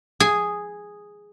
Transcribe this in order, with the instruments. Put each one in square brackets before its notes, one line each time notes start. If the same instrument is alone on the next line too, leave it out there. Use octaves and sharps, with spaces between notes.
[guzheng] G#4